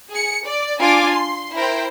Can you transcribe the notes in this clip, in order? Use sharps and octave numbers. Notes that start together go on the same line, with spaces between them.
G#4 C#7
D5
D4 F4 G#5 D6 A6
C6
E4 A#4 C5 G5